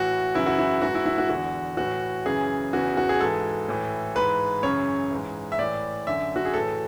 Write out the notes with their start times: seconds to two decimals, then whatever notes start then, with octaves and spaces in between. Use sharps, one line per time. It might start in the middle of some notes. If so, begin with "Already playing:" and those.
Already playing: A2 E3 F#4
0.35 F#2 C#3 E3 E4
0.46 F#4
0.58 E4
0.82 G#2 E3 F#4
0.95 E4
1.06 E4
1.18 F#4
1.29 E2 D3 F#4
1.77 A2 E3 F#4
2.26 F#2 C#3 E3 G#4
2.73 E2 C#3 E3 F#4
2.97 F#4
3.09 G#4
3.20 G#2 E3 A4
3.68 A2 E3
4.15 G#2 E3 B4
4.63 F#2 C#3 E3 C#5
5.11 G#2 E3
5.52 E5
5.59 A2 E3 D5
6.07 F#2 D3 E5
6.36 F#4
6.45 G#4
6.54 A2 E3 A4